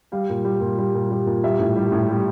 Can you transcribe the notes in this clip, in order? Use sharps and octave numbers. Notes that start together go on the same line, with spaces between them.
G3 F5
A#2
G3
A#2
G3
A#2
G3
A#2
G3 E5
A2
G3
A2
G3